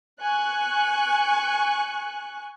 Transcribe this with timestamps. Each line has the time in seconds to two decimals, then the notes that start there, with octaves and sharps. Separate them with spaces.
0.21 G#5 C#6 F#6